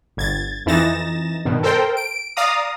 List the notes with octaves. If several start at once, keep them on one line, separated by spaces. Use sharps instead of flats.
G1 G#6 A6
F2 E3 D#4 A6 A#6 E7
G2 B2 D#3
A4 A#4 C5 G5
D7
D5 F5 A#5 D#6